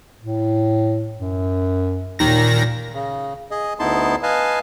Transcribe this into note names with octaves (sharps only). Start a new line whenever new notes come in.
A2
F#2
D#2 A#2 D#3 A#6
C#3
G#4 D#5
D2 B3 D#4 E4 A5 C6
B4 D#5 F5 G#5 A5